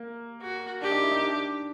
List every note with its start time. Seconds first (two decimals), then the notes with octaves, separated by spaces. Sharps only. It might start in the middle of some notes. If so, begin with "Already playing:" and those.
Already playing: A#3
0.41 F#4
0.81 D4 G4
0.91 D#4
1.01 E4
1.11 D#4
1.21 D4